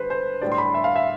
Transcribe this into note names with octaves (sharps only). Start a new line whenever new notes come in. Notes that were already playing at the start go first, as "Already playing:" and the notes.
Already playing: D3 G3 B4 C5
C5
A2 G3 D4 D5
C6
B5
E5
F5
E5